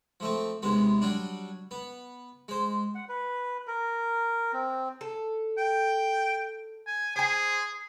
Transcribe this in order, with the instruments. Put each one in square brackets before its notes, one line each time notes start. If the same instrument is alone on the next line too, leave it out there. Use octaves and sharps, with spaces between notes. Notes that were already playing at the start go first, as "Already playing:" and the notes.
[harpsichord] F3 A3 C4
D#2 C3 G#3 B3
F#3 G3 D4
B3
G#3 C5
[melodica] F#5
B4
A#4
C4
[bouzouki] A4
[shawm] G5
G#5
[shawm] G#4 [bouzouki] C5 G#5